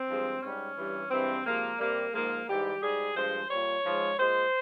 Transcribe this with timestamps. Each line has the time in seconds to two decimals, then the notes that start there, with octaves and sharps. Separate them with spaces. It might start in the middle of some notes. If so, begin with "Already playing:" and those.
Already playing: C4
0.09 G2 F3 G#3
0.42 G#2 G3 C#4
0.77 G2 E3 G3
1.11 G2 E3 G#3 C4
1.46 C3 F3 G#3 A#3
1.79 C3 G3 A#3
2.14 G#2 F3 G#3 A#3
2.48 G#2 E3 G3 G4
2.83 G#2 G3 G#4
3.16 G2 F3 G#3 C5
3.50 A#2 G3 C#5
3.84 G#2 F3 G#3
4.19 A#2 G#3 C5